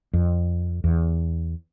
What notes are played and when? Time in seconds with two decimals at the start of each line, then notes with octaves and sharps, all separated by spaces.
0.13 F2
0.84 E2